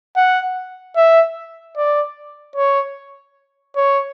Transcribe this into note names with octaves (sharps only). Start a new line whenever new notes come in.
F#5
E5
D5
C#5
C#5